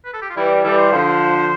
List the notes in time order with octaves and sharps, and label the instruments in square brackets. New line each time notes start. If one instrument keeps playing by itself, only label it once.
[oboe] B4
A4
G4
F4
[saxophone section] E3 G3 [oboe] E4
[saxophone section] E3 G3 [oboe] A4
[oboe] C5
[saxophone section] D3 F3